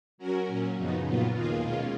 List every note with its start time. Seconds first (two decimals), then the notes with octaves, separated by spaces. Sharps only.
0.18 F#3 C#4 F#4 A#4
0.47 A#2 F#3 C#4
0.76 F#2 C#3 F3 B3 D#4
1.05 A#2 F#3 B3 F4
1.34 D#2 D#3 A#3 F4 G#4
1.62 B2 G#3 C#4 F4